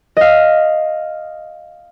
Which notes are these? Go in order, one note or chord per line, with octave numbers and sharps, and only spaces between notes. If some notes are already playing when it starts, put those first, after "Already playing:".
D#5 F5